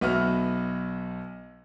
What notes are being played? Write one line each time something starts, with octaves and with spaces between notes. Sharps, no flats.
B1 B3 F#4 E5 F6